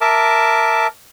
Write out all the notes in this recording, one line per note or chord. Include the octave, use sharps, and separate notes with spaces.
A#4 E5 A5 D6